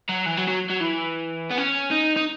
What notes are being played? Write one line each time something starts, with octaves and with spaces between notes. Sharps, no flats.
F#3
E3
F#3
F#3
F#3
E3
B3
C#4
D#4
D#4